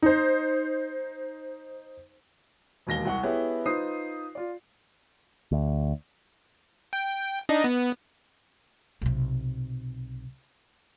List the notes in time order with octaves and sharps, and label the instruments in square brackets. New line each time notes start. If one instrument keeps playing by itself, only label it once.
[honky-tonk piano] D#4 C5
[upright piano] E1 D#2 A#6 G7
C2 F#5 C#6
B3 E4 G4 G#4 B4 C#5
D#4 F4 B4 C5 D#6 C7
F4 D5
[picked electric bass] D2
[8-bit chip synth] G5
D4 D#4 D#5
B3
[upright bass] B1 C3